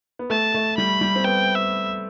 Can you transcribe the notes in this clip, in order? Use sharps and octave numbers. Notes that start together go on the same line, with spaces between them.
B3
A3 A5
A3
G3 B5
G3
C4
B3 G5
E5